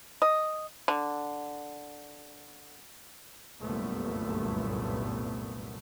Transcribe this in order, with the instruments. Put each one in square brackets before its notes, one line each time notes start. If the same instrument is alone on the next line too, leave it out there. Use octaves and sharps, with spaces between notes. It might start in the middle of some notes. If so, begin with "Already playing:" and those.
[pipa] D#5
D3
[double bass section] G1 C2 F#2 A#2 A3 B3